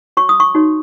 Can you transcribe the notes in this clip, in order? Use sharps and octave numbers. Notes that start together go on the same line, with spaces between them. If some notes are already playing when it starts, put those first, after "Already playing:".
F#4 C#5 C#6
D#6
C#6
D#4 F#4 C#5